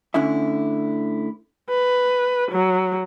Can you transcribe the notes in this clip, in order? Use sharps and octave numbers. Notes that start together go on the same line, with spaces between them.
D2 D3 C#4 E4 E5
B4
F#3